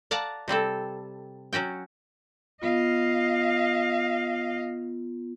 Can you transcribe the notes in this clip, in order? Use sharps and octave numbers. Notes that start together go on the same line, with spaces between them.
D5 F5 F#5 A5 A#5
C3 G3 C4 A4
F#3 C#4 F#4 G5
B3 F4 D#5 F5